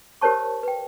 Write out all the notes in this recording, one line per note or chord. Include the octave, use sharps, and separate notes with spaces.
G4 A#4 C5 C#5 A5 C#6
B4 G5